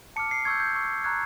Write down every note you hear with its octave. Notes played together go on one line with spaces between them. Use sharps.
A5 D6 F6 C#7
C7
C#6 E6 G6 G#6
G6
C#6 E6 G6
A#5 C#6 F#6 G#6